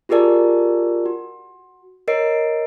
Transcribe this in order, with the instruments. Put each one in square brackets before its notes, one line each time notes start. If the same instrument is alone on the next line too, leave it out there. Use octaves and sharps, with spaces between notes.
[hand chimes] F4 G4 G#4 A#4 D5 A5
F#4
A#4 C#5 D#5 C7 D7